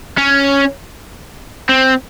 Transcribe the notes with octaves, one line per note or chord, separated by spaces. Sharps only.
C#4
C4